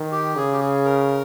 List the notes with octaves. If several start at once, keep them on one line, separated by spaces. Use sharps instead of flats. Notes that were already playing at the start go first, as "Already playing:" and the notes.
Already playing: D#3
G4
C#3 G#4
G4
G#4
A#4